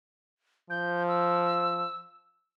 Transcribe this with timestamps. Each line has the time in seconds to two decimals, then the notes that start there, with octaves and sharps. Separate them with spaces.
0.70 F3 G6
1.08 E6